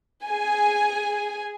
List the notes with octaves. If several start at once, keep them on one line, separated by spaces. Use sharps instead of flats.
G#4 G#5